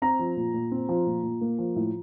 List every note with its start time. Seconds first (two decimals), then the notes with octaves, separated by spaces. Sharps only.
0.02 C4 A#5
0.19 F3
0.37 A#2
0.54 A#2
0.72 C4
0.89 F3
1.07 A#2
1.23 A#2
1.41 A#3
1.59 F3
1.76 A2